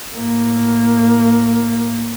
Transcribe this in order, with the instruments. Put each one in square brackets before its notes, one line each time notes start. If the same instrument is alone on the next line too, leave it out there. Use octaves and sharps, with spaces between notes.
[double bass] A2 A#3